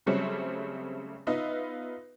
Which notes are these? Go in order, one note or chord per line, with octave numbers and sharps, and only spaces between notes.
C#3 F#3 G3 A3 C4 C#4
B3 D#4 F4 B4 D#5 E5